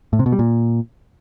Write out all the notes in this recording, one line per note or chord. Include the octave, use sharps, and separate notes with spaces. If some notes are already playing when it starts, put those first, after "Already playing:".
A2
C3
B2
G3
A#2